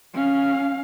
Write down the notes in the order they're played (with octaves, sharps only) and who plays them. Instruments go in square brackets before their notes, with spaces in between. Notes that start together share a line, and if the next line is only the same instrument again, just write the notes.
[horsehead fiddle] C#4 F5